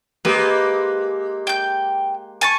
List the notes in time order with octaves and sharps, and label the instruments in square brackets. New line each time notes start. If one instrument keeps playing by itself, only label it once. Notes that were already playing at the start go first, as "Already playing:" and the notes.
[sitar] G#3 A#3 G4 [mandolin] B4
[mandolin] G5 G6
G#5 A5 C#6